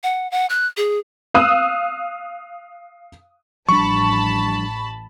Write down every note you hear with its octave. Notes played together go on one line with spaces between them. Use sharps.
F#5
F#5
F#6
G#4
F5 D#6 E6 F#6
A1 F3 G3 D4 A5 B5 C#6